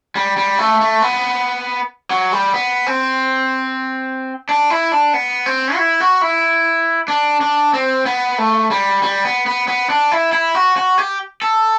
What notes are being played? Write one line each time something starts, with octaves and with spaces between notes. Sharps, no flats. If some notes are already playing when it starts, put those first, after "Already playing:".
G3
G3
A3
A3
B3
F#3
G3
B3
C4
D4
E4
D4
B3
C4
F#4
E4
F#4
E4
D4
D4
C4
B3
A3
G3
G3
B3
B3
B3
D4
E4
E4
F#4
F#4
G4
A4